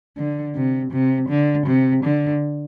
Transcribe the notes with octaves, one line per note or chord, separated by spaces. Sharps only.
D3
C3
C3
D3
C3
D3